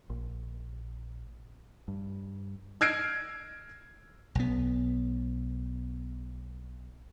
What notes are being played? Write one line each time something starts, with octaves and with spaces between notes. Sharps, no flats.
A#1
G2
E6 F6 G#6 A#6 C7 D7
B1 B3